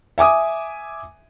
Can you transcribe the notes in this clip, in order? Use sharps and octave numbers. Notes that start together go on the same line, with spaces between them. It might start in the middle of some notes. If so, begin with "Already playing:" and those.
E5 G#5 D6 D#6